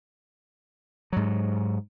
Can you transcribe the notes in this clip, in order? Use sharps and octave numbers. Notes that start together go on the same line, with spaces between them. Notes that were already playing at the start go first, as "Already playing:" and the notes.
G#2 F#3